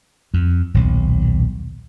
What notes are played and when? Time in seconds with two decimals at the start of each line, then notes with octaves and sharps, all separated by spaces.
0.34 F2
0.74 D#1 B1